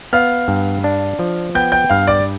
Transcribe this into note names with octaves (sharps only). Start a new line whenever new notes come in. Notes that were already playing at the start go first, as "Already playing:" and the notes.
B3 F5 F6
G2
D4
F3
B3 G5 G6
G5 G6
G2 F5 F6
D5 D6